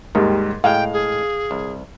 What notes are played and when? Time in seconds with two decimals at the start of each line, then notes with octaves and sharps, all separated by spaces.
0.15 D#2 G#2 D#3 G3
0.64 A2 G#3 F5 G5
0.93 G#4
1.51 C2